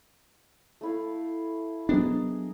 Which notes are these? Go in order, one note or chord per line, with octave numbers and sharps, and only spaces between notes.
A3 E4 F5
F#3 B3 D4 G#4 A#4 D#5